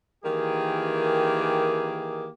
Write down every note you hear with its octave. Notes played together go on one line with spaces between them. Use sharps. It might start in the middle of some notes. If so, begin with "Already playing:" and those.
D#3 E3 A#3 G4 G#4